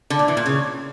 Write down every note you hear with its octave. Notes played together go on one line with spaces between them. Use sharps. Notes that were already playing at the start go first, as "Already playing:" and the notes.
D3
A#2
E3
A#2
C#3